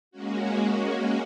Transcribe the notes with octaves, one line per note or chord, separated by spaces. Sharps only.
G#3 A#3 C#4 F#4